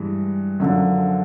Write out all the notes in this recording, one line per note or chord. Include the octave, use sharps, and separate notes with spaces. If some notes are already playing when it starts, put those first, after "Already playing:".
Already playing: G2 E3 G#3
F#2 D3 F3